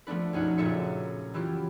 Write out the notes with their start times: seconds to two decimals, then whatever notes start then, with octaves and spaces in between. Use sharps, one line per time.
0.07 F3 A3 B3 D4 B4
0.33 B1 F#2 D#4 F#5
0.58 F#1 F#2 A#2 A4 E5 C#7
1.34 E3 F#3 E4 F4 G4